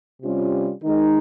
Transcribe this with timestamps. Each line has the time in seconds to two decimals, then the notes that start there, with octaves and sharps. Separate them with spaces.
0.21 C3 G3 C#4 F4
0.82 D#3 G#3 D#4 A#4 D#5